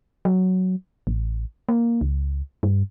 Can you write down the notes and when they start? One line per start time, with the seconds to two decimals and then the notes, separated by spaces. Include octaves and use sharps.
0.25 F#3
1.07 A1
1.69 A#3
2.01 C#2
2.63 G2